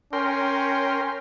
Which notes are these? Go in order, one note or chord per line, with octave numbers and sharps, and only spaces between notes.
C#4 A#4 G5 C6